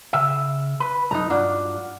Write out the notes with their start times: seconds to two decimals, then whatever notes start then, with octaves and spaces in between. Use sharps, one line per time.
0.13 C#3 E5
0.80 B4
1.11 C2 F#2 D#4 A4 A#5
1.30 G2 D4 F4 F#4